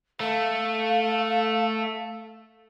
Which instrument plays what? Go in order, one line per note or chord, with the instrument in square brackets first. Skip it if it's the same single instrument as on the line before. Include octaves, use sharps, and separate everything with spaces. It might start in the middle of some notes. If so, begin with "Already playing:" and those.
[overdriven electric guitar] A3 [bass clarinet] A4 [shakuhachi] F5